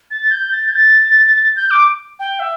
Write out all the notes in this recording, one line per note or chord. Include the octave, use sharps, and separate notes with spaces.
A6
G6
A6
G6
A6
G6
D6
G5
E5